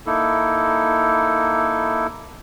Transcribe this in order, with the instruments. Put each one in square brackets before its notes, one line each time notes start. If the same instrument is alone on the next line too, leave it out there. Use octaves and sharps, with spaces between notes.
[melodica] A#3 D#4 E4 A4